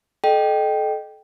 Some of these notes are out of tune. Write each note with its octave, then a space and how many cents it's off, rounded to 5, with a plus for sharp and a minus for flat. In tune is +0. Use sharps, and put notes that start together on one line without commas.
A4 -30 D#5 -20 G5 -5